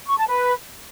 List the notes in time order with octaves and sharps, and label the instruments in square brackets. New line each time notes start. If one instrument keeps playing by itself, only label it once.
[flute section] C#6
A5
B4